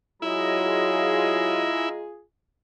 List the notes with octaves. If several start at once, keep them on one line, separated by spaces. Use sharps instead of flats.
F#3 G#3 E4 F4 G#4 D#5 A#5